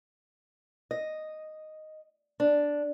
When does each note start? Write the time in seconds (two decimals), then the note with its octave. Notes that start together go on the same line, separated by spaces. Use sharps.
0.91 D#5
2.40 D4